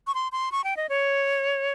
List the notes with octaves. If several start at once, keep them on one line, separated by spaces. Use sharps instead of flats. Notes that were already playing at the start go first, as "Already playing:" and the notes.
C#6
C6
C6
C#6
G5
D#5
C#5